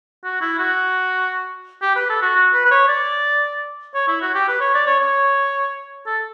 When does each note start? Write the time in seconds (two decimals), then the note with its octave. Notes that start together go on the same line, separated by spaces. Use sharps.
0.24 F#4
0.41 E4
0.58 F#4
1.82 G4
1.96 B4
2.10 A4
2.22 F#4
2.36 F#4
2.53 B4
2.65 B4
2.71 C#5
2.88 D5
3.94 C#5
4.08 E4
4.22 F#4
4.35 G4
4.48 B4
4.61 C#5
4.75 D5
4.87 C#5
5.00 C#5
6.06 A4